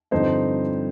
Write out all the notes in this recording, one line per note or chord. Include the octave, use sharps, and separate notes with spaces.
G2 D3 F3 C4 D#4 C5